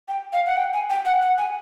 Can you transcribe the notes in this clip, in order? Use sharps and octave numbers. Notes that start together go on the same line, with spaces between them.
G5
F5
F#5
G5
G#5
G5
F#5
F#5
G#5